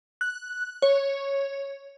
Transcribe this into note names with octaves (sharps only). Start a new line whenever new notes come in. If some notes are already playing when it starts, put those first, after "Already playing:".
F#6
C#5